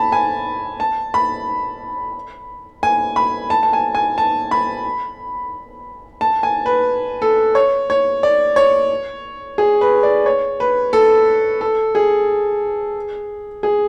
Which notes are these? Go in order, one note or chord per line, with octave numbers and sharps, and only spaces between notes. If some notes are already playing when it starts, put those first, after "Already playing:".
Already playing: A5 B5
G#5
A5
B5
G#5
B5
A5
A5
G#5
G#5
A5
B5
A5
G#5
B4
A4
C#5
C#5
D5
C#5
G#4
B4
D5
C#5
B4
A4
A4
G#4
G#4